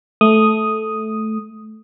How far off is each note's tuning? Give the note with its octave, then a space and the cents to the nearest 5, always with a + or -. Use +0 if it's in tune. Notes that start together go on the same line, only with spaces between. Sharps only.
A3 -10 D#6 +0